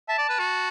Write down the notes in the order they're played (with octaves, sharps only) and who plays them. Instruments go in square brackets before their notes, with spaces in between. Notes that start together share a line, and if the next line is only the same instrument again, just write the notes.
[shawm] E5 [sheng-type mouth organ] A5
[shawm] D5
B4
F#4